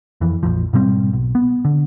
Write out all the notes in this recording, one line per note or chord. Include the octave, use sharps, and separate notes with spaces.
F2 E3
A#1 F2 F3
G#2 B2 G3 C4
B1
B3
D3